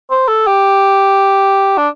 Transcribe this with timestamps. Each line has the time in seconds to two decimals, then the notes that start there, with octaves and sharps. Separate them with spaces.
0.11 C5
0.28 A4
0.47 G4
1.78 D4